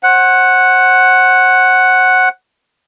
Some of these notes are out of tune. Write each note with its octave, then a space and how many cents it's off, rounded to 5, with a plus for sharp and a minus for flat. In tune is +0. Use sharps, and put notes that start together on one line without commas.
C5 +40 F#5 +0